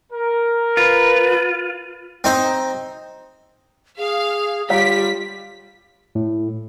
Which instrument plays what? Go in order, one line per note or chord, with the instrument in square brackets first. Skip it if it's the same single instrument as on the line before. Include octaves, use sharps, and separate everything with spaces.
[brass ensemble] A#4
[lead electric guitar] F4 [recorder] B4
[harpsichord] C4 D#4 C5
[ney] G#4 [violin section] F5
[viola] G3 [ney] F4 [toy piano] C#5 F5 A#5 [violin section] B6
[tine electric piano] A2